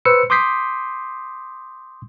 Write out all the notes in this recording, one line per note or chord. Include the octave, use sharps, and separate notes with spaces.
B4 C5 E6 C#7
C6 D6 D#6 G6 B6 C7